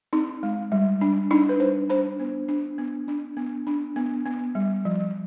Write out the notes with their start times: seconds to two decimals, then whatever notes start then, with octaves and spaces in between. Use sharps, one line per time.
0.13 C4 D#4
0.43 G#3
0.72 G3
1.01 D4
1.31 D4 D#4
1.49 B4
1.60 G3 C5
1.90 D4 C5
2.20 B3
2.48 D4
2.78 B3
3.08 D4
3.37 B3
3.67 D4
3.96 B3
4.26 B3
4.55 G3
4.85 F3